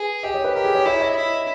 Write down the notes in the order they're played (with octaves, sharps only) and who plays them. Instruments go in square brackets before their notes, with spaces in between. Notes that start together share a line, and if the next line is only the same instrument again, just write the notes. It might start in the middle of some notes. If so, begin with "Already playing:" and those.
Already playing: [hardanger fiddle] G#4 [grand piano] B4
[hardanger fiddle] G4 [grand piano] D#5
[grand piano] C#5
B4
[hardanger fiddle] G4 [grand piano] A#4
[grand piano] G#4
C#5
[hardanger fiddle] E4 [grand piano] C#5
[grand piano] D#5
[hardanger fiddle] E4